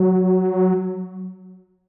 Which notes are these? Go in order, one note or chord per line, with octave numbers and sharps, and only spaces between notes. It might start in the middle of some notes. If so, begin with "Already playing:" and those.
Already playing: F#3